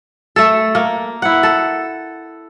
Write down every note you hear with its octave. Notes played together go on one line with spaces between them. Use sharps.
A3 A4
A#3
E4 F#5
A4